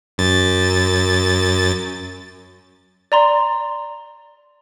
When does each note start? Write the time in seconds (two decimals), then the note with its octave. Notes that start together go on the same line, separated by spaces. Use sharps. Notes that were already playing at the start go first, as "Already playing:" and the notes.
0.18 F#2 A6
3.12 D5 A#5 C6